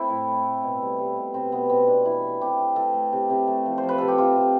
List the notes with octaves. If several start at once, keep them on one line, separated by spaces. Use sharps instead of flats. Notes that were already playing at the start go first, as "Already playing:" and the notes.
Already playing: A3 C4 E4
A2
A3
A2
B2
G3
G3
B2
B2 C4
B2 B3
B2 C4
B2 D4
E3 E4
A3
C3 G4
E3
A3 A4
A3
C3
C3
A3
F3
C5
F3
B4
C3 A4
G4
C3 F4
C3